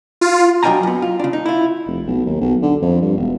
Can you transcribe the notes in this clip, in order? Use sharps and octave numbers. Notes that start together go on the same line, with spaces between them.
F4
F#3 D4 D#5 G5 G#5 A#5
F#2 B3
F4
C#3 D4
D#4
E4 F4
F1
B1
D#2
B1
D3
F2
G2
E1